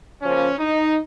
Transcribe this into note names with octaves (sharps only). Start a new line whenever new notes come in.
C#3 F3 A#3 C#4
D#4